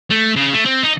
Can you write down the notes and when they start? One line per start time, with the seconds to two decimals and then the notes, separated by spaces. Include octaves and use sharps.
0.11 A3
0.36 C#3
0.53 A3
0.65 C4
0.83 D#4